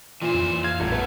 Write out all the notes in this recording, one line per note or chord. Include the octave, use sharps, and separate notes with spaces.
A#2 E3 C5
F2
F5 G#6
D#1 A1 A2
A3 B3